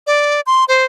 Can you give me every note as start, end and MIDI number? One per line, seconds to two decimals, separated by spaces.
0.07 0.41 74
0.46 0.64 84
0.68 0.85 72